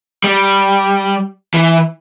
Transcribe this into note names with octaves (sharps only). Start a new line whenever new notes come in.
G3
E3